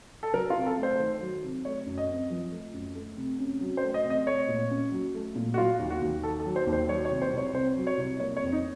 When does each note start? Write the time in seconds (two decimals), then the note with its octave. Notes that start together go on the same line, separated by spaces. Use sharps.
0.23 A4
0.33 F#3 A#4
0.50 F4
0.56 C3
0.66 A4
0.77 A3
0.83 C5
0.99 D#3
1.21 F#3
1.44 C3
1.65 A3 C#5
1.86 F#2
1.98 D#5
2.09 C4
2.30 F3
2.52 A3
2.73 F#2
2.95 A3
3.17 C3
3.39 C#4
3.61 F#3
3.77 C5
3.83 A3
3.94 D#5
4.04 C3
4.10 D#5
4.27 A3 C#5
4.48 A#2
4.70 C#4
4.92 F#3
5.15 A3
5.35 A#2
5.54 F#4
5.57 F#3 F4
5.79 D#2
5.90 F#4
6.02 D#2
6.23 D#3 A4
6.40 A4
6.46 F#3
6.56 C5
6.67 D#2
6.73 C5
6.89 F#3 C#5
7.05 C#5
7.10 C2
7.22 C5
7.33 C2 C#5
7.54 C3 C5
7.77 F#3
7.87 C#5
7.98 C2
8.20 A#3 C#5
8.37 C#5
8.42 F2
8.52 D#4